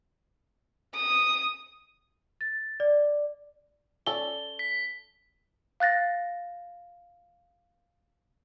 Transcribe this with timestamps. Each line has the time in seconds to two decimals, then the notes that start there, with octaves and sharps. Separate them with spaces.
0.95 D#6
2.41 A6
2.80 D5
4.07 C#4 A4 D5 G7
4.59 B6
5.80 F5 F#6 A6 A#6